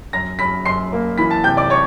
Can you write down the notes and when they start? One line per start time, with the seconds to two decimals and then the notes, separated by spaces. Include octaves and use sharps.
0.13 F#2 A#5 A#6
0.39 F#2 B5 B6
0.65 F#2 C6 C7
0.92 A#3
1.18 E3 B5 B6
1.31 A5 A6
1.44 C3 G5 G6
1.57 D5 D6
1.70 C#5 C#6